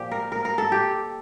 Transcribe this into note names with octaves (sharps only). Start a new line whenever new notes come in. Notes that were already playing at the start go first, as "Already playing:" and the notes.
Already playing: A#2 F3 G4
A#4
A#4
A#4
A4
G4